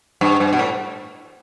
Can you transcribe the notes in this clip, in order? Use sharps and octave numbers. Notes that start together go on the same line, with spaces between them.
G2
G2
B2
A2